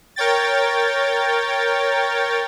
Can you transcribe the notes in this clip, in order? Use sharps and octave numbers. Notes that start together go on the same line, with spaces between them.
A#4 C#5 G5 A6